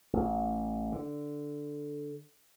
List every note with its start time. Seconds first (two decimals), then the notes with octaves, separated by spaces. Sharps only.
0.13 A1
0.92 D3